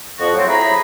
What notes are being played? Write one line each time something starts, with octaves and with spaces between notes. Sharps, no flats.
F2 F3 F#4
F#3 A3 C4
E4 G#4 A#5 B5